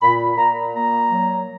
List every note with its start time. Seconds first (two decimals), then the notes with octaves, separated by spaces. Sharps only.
0.02 A#2 B5
0.37 A#2 A#5
0.74 A#3 A#5
1.10 F#3